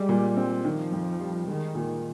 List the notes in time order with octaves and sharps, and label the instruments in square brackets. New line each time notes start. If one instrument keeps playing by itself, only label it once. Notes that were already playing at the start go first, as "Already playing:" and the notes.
Already playing: [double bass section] G3 [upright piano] G#3
[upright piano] A#2
C4
[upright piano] D#3 [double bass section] F3
[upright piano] F2
G3
[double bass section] D#3 [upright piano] G#3
[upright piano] A#2